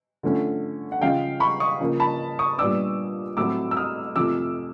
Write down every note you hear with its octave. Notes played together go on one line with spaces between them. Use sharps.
D3 F3 A3 C#4
F#5
C#3 F3 G#3 C#4 F5 G5
B5 C#6
C#6 D#6
C#3 F3 A#3
A5 B5
C#6 D#6
A#2 G3 B3 D4 D6 E6
A2 F#3 A3 C4 D6 E6
E6
D#6 F6
F2 C3 F3 A3 D6 E6